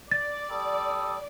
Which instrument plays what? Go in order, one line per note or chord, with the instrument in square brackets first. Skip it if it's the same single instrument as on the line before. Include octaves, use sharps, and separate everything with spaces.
[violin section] D5 [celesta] A6
[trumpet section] G3 A4 D#6